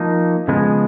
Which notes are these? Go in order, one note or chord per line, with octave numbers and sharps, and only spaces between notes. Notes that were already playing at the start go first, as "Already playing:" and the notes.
Already playing: F3 A#3 D#4
C#3 F3 G#3 B3